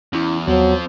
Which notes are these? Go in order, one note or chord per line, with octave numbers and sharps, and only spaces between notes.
E2 C#4 E4
D#2 F3 F#3 B3 C4